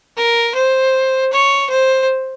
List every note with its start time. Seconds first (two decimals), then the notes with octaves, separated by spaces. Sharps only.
0.17 A#4
0.55 C5
1.32 C#5
1.70 C5